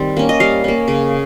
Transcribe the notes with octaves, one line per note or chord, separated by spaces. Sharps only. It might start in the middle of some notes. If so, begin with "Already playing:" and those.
Already playing: D#3 G3 C4
A#3 C#4
D#5
G3 F5
A#3 C#4
C#3